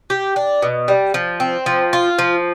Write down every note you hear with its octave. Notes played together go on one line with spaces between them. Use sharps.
G4
D4
B2
G3
F3
C4
F3
F4
F3